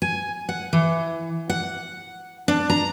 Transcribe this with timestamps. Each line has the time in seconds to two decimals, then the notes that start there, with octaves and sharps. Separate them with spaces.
0.02 G#5
0.49 F#5
0.73 E3
1.49 F#5
2.48 D4
2.70 A#5